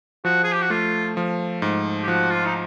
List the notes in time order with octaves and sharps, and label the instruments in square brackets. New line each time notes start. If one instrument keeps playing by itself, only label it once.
[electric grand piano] F3 [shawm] F#4
[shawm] G#4
G4
F#4
[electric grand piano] A3 [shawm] F4
[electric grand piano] F3
G#2
[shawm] G4
[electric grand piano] F3 [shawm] F#4
[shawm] F4
D#4